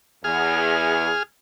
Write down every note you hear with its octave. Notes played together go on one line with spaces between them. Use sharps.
E2 G#4 F6